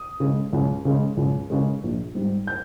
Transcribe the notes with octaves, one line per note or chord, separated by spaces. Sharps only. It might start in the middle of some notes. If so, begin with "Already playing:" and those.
Already playing: D#6
C#3 G#3
C#2
C#3 G#3
C#2
C#3 G#3
A#1
G#2 G3
G6